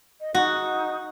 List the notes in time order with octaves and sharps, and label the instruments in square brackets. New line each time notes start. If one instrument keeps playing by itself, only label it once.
[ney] D#5
[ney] D#4 [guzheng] F#4